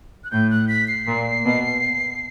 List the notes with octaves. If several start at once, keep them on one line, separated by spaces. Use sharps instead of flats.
F#6
A2 G6
F#6
B6
C7
A#2
B2